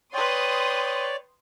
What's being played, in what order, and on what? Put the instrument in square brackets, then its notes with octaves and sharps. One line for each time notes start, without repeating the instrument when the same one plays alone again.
[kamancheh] B4 G5 [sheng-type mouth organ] C#5 D5 [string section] C6 D#6